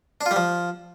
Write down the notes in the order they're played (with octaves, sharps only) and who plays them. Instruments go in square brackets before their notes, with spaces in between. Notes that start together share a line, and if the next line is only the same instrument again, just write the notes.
[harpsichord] D4
F4
G3
F3